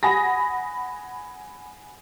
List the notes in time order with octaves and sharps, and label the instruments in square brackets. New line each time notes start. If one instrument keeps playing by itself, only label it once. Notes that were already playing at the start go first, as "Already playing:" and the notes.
[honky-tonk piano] F#5 G#5 B5 D#6 A#6